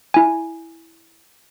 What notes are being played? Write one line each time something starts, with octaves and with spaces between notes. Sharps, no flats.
E4 G#5